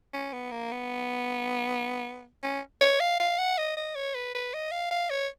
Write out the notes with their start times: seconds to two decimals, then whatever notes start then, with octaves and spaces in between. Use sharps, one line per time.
0.13 C#4
0.33 B3
0.51 A#3
0.71 B3
2.43 C#4
2.81 C#5
3.00 F5
3.20 F5
3.38 F#5
3.58 D#5
3.77 D#5
3.95 C#5
4.15 B4
4.34 B4
4.54 D#5
4.72 F5
4.91 F5
5.10 C#5